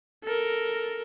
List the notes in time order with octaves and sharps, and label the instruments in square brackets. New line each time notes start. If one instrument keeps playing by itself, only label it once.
[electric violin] A4 A#4